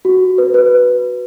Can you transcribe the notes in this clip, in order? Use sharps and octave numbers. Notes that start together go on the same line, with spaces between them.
F#4
B4
B4